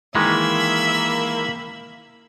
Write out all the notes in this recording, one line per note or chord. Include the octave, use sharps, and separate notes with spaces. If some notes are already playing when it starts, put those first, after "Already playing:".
D#3 E3 G#3 A#3 E5 B5